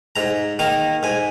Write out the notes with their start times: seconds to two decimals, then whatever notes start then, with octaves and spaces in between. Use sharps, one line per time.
0.16 G#2 A#5
0.59 D#3 A#3 A#5
1.03 G#2 G#5